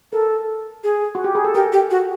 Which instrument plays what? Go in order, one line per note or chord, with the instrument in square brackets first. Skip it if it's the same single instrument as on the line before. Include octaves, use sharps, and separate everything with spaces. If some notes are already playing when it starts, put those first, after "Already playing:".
[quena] A4 [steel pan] A#4
[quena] G#4
[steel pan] F#4
G4
G#4
A4
[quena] G4 [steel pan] A#4
[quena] G4
F#4